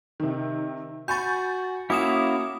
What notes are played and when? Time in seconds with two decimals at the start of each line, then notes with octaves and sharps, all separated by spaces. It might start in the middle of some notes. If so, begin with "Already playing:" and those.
0.20 C3 D#3
1.08 F#4 G#5 B5 C#6 G6 A6
1.90 A#3 C#4 E4 F#4 F#5 D6 D#6 E7